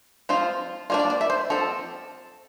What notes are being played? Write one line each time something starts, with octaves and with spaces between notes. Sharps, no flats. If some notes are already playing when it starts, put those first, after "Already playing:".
F3 C4 F4
G3 A#3 D4 F4
D5
D5
E5
C5
F3 C4 A4